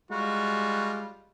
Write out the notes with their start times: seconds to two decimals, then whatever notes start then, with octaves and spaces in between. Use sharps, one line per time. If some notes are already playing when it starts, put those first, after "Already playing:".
0.11 G3 G#3 F4 F#4